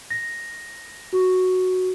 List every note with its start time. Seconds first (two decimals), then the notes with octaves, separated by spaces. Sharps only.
0.10 A#6
1.13 F#4